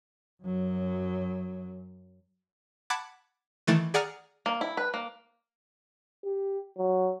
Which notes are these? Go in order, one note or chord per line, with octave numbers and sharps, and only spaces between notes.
F#2 F#3
F#5 A5 B5 D6 F#6 G#6
D#3 E3 A3 B5 A6 D7
G#4 D5 F#5 G#5 A#5 F6
A#3
E4
B4
A#3
G4
F#3